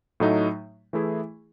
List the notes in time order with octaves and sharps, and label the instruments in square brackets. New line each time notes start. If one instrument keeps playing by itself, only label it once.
[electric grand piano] A2 F#3 A3 D#4
E3 A3 E4 G#4